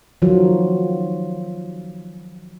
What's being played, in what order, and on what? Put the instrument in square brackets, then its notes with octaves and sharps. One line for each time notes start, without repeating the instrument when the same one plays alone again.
[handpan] D#3 F3 F#3 F4